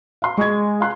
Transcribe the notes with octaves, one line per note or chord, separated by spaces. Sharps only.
F5 C6
G#3 C#6 G#6
F5 C6 F#6